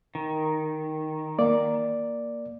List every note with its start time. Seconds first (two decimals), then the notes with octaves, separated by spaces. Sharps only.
0.15 D#3
1.39 A#3 D5